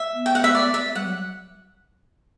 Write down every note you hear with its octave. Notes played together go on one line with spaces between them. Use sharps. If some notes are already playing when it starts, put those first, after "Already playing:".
Already playing: E5
B3
G5
F#5
E5
D5
E5
G3 F#5
F#3